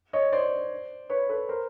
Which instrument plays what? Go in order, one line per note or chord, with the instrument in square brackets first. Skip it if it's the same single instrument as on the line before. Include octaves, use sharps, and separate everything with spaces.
[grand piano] C#5 D#5
C5 D5
B4 C#5
A4 B4
A#4 C5